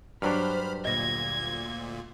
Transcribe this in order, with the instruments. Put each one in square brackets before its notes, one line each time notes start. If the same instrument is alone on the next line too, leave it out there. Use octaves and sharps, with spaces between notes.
[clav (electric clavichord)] G2 F#3 D4 [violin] B4 C5 [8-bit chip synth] B5 F6
[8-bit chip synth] D2 A#2 [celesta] D#5 A#6 [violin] G#6